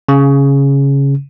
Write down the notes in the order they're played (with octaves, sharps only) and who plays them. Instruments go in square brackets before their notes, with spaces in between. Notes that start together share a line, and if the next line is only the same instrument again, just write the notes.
[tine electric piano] C#3